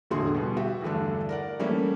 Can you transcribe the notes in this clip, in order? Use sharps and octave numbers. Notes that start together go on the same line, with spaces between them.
E1 A2 D3 F#4 G#4 C6
B2 G3
F#4 G4 E5
E2 G2 D3 A3 D4
A#4 D5 F#5
E3 G3 A3 A#3 C#4